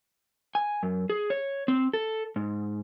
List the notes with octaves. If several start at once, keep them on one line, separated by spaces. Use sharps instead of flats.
G#5
F#2
G#4
C#5
C4
A4
G#2